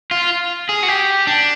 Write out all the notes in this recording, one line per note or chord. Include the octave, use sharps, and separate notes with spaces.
F4
G#4
F#4
G4
D4